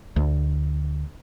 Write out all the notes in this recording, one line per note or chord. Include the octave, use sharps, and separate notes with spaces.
D2